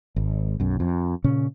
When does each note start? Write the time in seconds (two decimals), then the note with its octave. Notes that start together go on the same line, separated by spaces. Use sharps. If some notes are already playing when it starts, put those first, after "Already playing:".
0.16 G#1
0.60 B1 F#2
0.80 F2
1.24 A#2 C#3 C#4